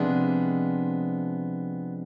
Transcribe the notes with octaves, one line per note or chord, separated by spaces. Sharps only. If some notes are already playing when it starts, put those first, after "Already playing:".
Already playing: C3 F3 G#3 B3 D4